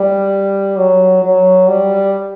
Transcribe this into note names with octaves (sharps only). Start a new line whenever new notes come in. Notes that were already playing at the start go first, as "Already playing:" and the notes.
Already playing: G3
F#3
F#3
G3